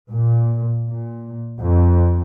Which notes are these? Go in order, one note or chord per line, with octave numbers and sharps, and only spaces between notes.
A#2
A#2
F2